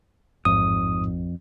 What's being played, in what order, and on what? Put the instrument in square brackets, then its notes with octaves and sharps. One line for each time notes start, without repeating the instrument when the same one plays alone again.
[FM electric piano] A1 [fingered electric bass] F2 [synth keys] G#2 [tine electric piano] D#6